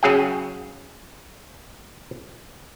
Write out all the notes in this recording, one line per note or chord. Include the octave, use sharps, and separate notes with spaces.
C#3 F#3 G#4 F5 G5